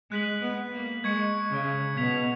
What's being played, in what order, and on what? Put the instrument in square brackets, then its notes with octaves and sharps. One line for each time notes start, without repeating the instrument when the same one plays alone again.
[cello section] G#3 [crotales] F#6 B6 F#7
[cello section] B3
A#3
[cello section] G#3 [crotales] C#6 G#6 C#7
[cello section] C#3
[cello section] B2 [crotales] G#6 B6 F7